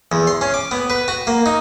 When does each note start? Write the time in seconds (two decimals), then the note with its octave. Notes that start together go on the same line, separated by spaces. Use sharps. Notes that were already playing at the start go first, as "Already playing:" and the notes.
0.12 E2
0.27 C6
0.41 C#4
0.54 D6
0.71 B3
0.90 B4
1.08 F#4
1.27 A#3
1.46 D#4